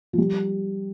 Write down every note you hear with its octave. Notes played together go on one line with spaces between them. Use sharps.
F3
G3